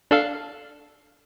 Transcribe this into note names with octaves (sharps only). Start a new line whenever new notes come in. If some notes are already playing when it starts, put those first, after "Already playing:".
D4 A4 F5